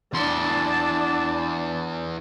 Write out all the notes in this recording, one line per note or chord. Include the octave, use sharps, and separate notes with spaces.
E2 D4 A5 C6